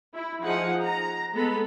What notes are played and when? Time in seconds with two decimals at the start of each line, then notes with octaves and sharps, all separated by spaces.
0.14 E4
0.43 F3 D#4 G#4 F#5
0.82 A#5
1.33 G#3 B3 A4 B5